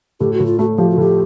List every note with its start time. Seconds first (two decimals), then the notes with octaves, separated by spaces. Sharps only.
0.20 A2 G4
0.33 F#4
0.40 A2
0.46 F4
0.59 A3 F#4
0.78 F3 G4
0.90 F#4
0.97 A2 G4